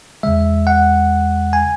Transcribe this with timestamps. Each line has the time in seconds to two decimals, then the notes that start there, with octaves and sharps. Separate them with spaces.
0.23 E2 C#3 G#3 E5
0.67 F#5
1.53 G#5